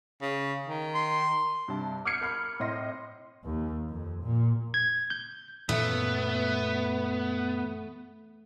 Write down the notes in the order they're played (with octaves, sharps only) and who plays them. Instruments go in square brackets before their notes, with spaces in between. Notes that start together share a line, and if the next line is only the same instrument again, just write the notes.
[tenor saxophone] C#3
D#3
[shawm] C6
[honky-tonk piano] G2 C3 A5
D6 F6 G6 G#6 C7 C#7
A#4 B5 F6
A2 C4 D#5 C6 A#6
[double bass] D#2
F2
A#2
[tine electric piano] G#6
G6
[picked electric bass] F#2 A#2 E3 [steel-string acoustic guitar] A3 [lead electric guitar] B3